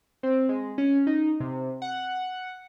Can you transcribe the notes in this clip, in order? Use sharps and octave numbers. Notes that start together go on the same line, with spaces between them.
C4
G#3
C#4
D#4
C3
F#5